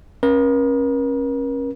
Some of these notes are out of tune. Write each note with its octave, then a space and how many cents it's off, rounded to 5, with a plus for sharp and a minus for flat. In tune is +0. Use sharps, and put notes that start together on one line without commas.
C#4 -25 A#4 +40